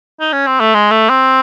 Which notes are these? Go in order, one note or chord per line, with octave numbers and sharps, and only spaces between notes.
D#4
C#4
C4
A3
G#3
A3
C4